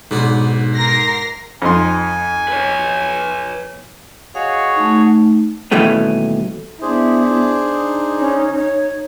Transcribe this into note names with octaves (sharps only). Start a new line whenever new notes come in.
B1 G#2 B3 D4
A#4 A#6 C7
F2 D#4 G#5 C6
B4 C#5
F#4 G#4 C#5 D#5 F5
A3 D#4
D#2 B2 E3 G3 A3 C#4
B3 D4 E4 G#4 C5
D#4
C#4
C#5